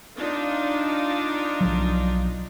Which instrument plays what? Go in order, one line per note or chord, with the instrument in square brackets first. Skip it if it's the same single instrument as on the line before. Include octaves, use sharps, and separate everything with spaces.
[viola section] D4 D#4 F4
[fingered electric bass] B1 F3 F#3